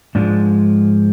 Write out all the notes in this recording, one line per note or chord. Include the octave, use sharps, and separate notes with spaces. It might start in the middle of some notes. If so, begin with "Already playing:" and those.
G#2 F3 G#3 D4